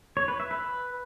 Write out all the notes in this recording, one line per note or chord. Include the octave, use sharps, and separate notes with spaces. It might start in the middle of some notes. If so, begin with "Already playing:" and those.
C#5
B4
E5
B4